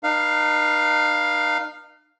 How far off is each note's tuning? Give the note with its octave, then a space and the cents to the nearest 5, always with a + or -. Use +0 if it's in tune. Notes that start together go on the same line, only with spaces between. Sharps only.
D#4 -40 B4 -40 F5 +0